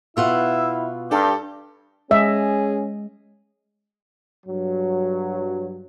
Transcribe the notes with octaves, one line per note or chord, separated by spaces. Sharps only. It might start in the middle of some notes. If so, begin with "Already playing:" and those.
B2 E4 F4 E5 F#5
G2 D4 G4 A4
G#3 C#4 G#4 D#5 E5
G2 F#3